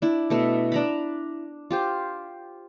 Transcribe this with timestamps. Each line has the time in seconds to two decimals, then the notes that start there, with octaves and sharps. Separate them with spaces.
0.02 D4 E4
0.30 B2 A3 E5
0.72 D4 A#5 B5
1.71 F4 G4 C5